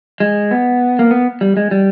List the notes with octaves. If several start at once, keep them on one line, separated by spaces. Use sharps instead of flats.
G#3
B3
A#3
B3
G3
G#3
G3